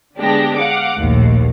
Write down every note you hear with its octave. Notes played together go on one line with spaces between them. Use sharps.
D3 G#3 B3 D4 G4 A#6
F5 F#5 D6
A#1 D#2 A2